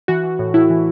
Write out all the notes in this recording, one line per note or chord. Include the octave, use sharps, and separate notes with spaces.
E3 F#4
E3
A2
A2 E4
E3